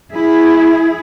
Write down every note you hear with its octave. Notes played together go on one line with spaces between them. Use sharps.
E4 G#4